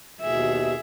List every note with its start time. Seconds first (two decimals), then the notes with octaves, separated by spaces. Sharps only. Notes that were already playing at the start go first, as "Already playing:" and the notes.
0.22 D#2 B2 G#4 E5